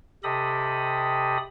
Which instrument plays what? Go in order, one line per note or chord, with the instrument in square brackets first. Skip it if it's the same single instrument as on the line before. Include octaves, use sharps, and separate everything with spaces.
[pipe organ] C3 G4 A4 D#5 B5 D#6